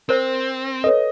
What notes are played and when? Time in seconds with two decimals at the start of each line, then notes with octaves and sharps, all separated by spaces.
0.09 C4 A#4 C5
0.84 A4 B4 C#5 D#5